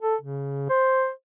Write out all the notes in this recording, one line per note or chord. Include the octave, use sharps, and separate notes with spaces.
A4
C#3
C5